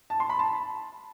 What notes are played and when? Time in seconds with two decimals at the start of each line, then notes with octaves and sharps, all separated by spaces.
0.10 A5
0.20 C6
0.30 B5
0.39 A5